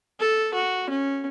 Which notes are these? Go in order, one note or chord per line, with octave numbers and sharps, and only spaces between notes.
A4
F#4
C#4